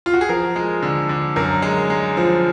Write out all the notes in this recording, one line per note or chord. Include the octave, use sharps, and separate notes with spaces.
F4
F#4
G#4
F3 A#4
G#3
D3
D3
F#2 A#4
G#3
G#3
F3